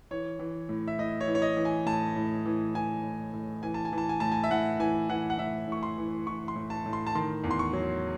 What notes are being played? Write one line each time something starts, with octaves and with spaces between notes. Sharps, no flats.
E3 C#5
E3
A2
E5
A2 D#5
C#5
E3
C#5
D#5
E3
G#5
A2 A5
A2
E3
E3 G#5
A2
A2
E3 G#5
A5
G#5
E3
A5
G#5
A2 A5
G#5
E5
A2 F#5
E3 G#5
E3 F#5
F#5
A2 E5
A2 C#6
C6
E3
E3 C#6
C6
A2
A5
A2
C6
A5
D#3 C6
E2
C6
C#6
F#3